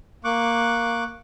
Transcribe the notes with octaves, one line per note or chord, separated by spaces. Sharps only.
A#3 C#6 D6 F#6